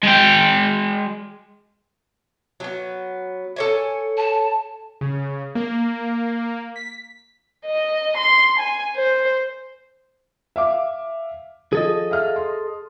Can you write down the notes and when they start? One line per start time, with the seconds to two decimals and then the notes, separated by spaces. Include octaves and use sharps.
0.03 G#3 G5
2.60 F#3 B3
3.56 A4 C#5 G#5
4.17 A5
5.01 C#3
5.55 A#3
6.76 B6
7.66 D#5
8.18 C6
8.60 G#5
8.96 C5
10.56 E5 F5 D6
11.73 F3 G#4 A4 D#5
12.11 E5 F5 F6
12.36 C6